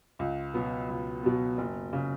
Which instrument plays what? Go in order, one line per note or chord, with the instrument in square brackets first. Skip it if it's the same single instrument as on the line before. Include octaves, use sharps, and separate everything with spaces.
[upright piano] C#2
B2 F#3 B3
C#2
B2 F#3 B3
F#1
C#3